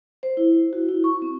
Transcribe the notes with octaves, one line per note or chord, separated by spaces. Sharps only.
C5
E4
F#4
E4
C#6
C4